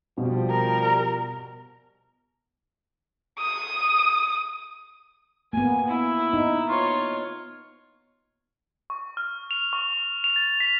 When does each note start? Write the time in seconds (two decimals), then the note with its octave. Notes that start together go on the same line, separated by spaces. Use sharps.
0.18 B2 F3 G3
0.50 A#4
3.40 D#6
5.53 A#3 B3 G#5
5.88 E4
6.33 D#4
6.70 F4 C#5
8.90 C#6
9.17 F6
9.51 F7
9.73 C#6
10.24 F7
10.36 A6
10.60 B6